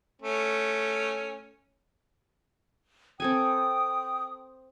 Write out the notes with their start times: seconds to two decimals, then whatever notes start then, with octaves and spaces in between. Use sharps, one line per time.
0.22 A3 C#4
3.20 C4 A4 G5 G#5 D#6